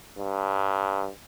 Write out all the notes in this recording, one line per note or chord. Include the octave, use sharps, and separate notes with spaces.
G2